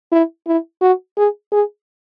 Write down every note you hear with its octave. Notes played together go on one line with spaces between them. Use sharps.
E4
E4
F#4
G#4
G#4